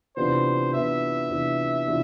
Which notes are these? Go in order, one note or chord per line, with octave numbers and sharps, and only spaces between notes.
C3 E3 B3 D4 F4 C5
C3 E3 B3 D4 F4 E5
C3 E3 B3 D4 F4
C3 E3 B3 D4 F4